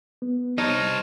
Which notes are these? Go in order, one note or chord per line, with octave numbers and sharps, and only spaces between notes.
B3
G3 D#4 C5 C#5 A5 F6